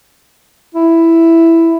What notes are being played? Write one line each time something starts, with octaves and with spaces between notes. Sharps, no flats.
E4